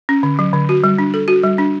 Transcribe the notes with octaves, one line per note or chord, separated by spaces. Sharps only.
C#4
D3
F#3
D3
F#4
G3
D4
A4
F#4
G3
D4